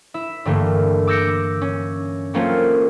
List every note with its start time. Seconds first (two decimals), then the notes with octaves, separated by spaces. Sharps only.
0.14 E4 E5
0.45 G2 D3 E3 A3 A#3
1.07 D6 E6 G6 A#6 C#7 D7
1.61 C#4
2.34 F#3 A3 A#3 C4 C#4 F4